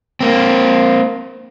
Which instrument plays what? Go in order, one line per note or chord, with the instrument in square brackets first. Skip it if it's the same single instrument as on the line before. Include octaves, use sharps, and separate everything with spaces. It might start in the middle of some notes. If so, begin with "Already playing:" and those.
[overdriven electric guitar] A#3 C4